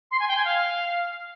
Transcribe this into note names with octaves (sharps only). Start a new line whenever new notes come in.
C6
G#5
G5
G#5
F5